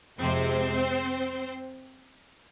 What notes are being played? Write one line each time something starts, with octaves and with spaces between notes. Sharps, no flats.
F2 C3 F3 G#3 C4 C5